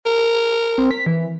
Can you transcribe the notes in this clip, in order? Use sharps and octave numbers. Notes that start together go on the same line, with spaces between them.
A#4
C4
B6
E3